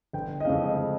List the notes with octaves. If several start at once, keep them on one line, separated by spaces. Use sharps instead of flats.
G1 G5
D#5
F2 C#3 G#3 F5
D#5